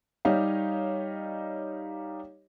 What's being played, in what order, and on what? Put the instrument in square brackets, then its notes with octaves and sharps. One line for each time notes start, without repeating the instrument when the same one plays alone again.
[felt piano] G3 D#4 G4 C#5 D#5 F5